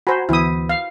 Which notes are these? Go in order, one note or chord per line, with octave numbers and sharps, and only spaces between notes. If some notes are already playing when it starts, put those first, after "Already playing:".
F#4 C5 G#5 A#5 B5
D2 E3 B3 E4 D#6
F5